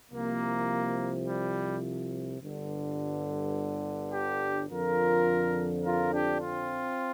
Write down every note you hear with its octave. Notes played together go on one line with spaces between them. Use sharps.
C2 C3 F3 A#3
G3
G1 G2 D3
D4 G4
F2 D3 F3 F4 A#4
F4 A#4
D4 G4
C4 F4